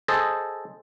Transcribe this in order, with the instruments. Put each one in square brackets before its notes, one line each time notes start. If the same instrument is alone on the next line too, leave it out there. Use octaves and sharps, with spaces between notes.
[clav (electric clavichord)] G#4 A4 C5 D#5